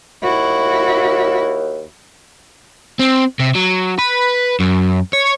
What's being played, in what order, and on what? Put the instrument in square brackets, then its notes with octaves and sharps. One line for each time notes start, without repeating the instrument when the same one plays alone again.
[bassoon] D#2 [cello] E4 F#4
[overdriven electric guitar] C4
C3
F#3
B4
F#2
C#5